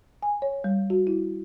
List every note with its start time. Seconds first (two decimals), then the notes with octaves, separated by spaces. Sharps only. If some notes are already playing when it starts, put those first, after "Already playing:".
0.23 G#5
0.42 C#5
0.64 G3
0.90 F#4
1.07 E4